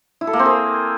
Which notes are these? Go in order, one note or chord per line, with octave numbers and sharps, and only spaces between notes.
E4
A4
A#3
C4
G#4